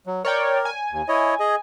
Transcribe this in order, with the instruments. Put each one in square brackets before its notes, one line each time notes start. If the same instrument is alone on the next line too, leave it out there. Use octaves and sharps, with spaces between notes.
[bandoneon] F#3
[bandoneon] A#4 [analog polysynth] C#5 D5 G5
[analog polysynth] G#5
[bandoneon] D#2
E4 C#5 D#5
G#4 D#5